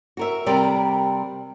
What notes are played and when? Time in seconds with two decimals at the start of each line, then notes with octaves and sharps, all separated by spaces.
0.17 F#4 A#4 E5
0.46 C3 G3 A#4 D5 G5